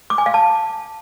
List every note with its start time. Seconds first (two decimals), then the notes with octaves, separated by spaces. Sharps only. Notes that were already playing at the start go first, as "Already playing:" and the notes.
0.10 D6
0.18 G#5
0.26 F5
0.34 A5